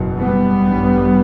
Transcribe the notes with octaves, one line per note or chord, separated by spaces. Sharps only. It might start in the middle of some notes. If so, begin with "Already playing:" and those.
Already playing: F#1 E2 B2
G3 B3
A1 G2